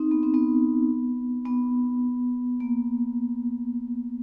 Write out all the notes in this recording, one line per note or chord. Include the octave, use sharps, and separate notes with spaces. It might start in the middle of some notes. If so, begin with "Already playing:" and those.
Already playing: C4 D#4
B3
C4
B3
B3
A#3